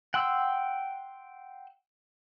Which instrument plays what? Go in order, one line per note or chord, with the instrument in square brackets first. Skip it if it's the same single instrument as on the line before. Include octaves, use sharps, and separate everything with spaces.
[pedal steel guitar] F#5 G5 C6 E6